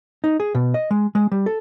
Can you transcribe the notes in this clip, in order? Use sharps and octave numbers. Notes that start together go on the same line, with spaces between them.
D#4
G#4
B2
D#5
G#3
G#3
G3
A4